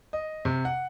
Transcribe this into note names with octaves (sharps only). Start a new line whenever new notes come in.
D#5
C3
F#5